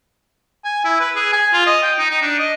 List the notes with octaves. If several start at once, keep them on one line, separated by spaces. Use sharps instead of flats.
G#5
E4
B4
G#4
G#5
F4
D#5
G5
D#4
D#4
D4
D#5